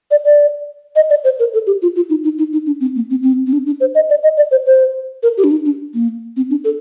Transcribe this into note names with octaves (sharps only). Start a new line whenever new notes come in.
D5
D5
D#5
D5
C5
A#4
A4
G4
F4
F4
D#4
D#4
D#4
D#4
D4
C4
A#3
C4
C4
C4
D4
D4
C5
D#5
D5
D#5
D5
C5
C5
A#4
G4
D4
D#4
D4
A#3
C4
D4
A4